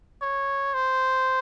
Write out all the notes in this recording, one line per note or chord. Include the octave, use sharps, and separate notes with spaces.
C#5
C5